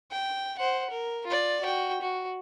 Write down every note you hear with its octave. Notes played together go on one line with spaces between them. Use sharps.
G5
C5 F#5
A#4
F4 D5
F#4 G5
F#4